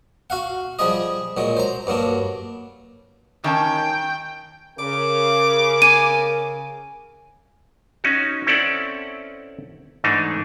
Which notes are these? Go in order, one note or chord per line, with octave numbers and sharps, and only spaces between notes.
F#4 F5 F#5
F3 G3 G#4 D#5
A#2 F#3 G#3
C5 A#5
G2 F#3 A#3 D4
D#3 C#4 G5 A5
C#3 A#4 D6
G#5 D#7
C#4 D#4 F#4
C4 C#4 E4 A4 D5 F#5
G#2 E3 A3 D4 D#4